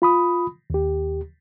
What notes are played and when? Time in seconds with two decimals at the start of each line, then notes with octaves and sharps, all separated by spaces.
0.02 F4 B5 D#6
0.70 D#2 G4